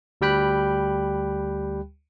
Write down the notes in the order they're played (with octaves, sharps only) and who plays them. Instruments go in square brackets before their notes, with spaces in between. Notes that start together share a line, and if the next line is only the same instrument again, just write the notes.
[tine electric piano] D2 G3 G4 G5 B5 F#6